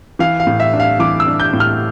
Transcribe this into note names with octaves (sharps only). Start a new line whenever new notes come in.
E3 F5
F5
A2
E5
D4
F5
E3 D6
E6
D4
G6
A2
F6